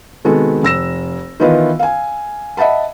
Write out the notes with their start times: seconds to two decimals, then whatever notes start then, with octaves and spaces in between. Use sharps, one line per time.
0.24 C3 D#3 G#3 B3 F#4 A4
0.63 F1 E6 A#6 E7
1.40 D#3 E3 B3 F4 B4 D#5
1.79 F5 G#5
2.57 D#5 E5 F#5 A5 B5